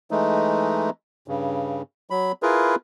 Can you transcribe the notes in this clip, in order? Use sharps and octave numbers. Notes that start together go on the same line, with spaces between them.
E3 G#3 A3 D#4
G2 C#3
F#3 B5
E4 F4 G#4 A#4 B4